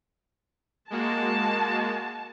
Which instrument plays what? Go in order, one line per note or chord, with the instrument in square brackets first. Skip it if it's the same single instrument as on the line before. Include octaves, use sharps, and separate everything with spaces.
[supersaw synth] G#3 A#3 F#4 [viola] A5